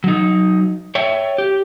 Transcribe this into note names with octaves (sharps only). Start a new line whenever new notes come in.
F#3 D#4
C#5 E5 G5
G4